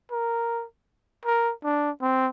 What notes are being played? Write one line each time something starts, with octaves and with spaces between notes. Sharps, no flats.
A#4
A#4
D4
C4